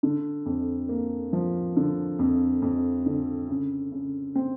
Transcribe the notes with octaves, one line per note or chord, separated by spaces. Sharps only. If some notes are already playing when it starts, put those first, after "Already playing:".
D3
F2
A#3
F3
D3
F2
F2
D3
C#3
C#3
C4